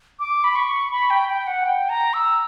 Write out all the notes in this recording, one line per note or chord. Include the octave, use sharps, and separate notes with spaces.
D6
B5
C#6
B5
G5
G5
F#5
G5
A#5
E6